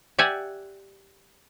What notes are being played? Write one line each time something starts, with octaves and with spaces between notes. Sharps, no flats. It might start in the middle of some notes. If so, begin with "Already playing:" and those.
G4 D5 E5 F#5 G#5